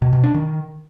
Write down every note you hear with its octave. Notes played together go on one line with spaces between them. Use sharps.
B2
B2
D4
D#3